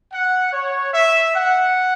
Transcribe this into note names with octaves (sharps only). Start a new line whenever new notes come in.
F#5
C#5
E5
F#5